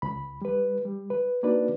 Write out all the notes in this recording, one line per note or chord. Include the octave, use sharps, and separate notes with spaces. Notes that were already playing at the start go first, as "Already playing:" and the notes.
C#2 B5
G3 B4
G3
B4
A#3 D4 D#4 F#4 B4 D5